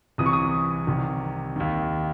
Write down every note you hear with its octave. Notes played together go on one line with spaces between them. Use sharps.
C2 C3 E3 D#6
C#6
D#6
C2 C3 D#3
D#2 D#3